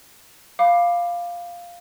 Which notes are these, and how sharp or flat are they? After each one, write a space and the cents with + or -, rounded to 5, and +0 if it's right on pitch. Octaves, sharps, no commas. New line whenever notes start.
F5 +0 B5 +0 D6 +15